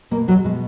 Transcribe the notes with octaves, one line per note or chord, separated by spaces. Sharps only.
B2 A#3
E2 F#3
B2 G#3